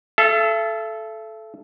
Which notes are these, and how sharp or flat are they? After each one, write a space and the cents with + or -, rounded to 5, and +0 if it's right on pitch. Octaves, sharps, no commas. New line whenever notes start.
A4 -15 E5 +40